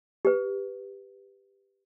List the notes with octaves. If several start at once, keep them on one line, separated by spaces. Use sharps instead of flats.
G4 B4